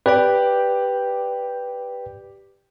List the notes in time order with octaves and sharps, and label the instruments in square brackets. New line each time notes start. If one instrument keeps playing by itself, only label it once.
[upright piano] G4 D5 [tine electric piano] B4 G5